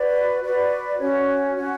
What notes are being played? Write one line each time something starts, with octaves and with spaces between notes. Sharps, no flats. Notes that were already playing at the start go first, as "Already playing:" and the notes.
Already playing: F#4 B4 D5
F#4 B4 D5
C#4 F#4 C#5
C#4 F#4 C#5